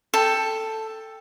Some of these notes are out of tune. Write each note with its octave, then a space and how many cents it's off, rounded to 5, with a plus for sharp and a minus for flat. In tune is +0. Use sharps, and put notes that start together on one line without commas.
A4 +5 G5 +10